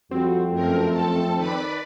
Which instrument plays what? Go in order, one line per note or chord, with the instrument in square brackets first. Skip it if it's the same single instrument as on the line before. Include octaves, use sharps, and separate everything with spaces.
[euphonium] F2 [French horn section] G3 F#4 [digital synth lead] C4
[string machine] F#2 A#4 [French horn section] A3
[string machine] A4 A5
[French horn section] D#3 [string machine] B4 D5 B5